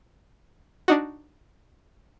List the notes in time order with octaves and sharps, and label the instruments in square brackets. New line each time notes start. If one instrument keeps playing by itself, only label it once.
[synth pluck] D4 D#4 F#4